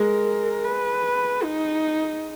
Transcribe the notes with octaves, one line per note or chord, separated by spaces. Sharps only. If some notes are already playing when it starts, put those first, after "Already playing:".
Already playing: G#3 A#4
B4
D#4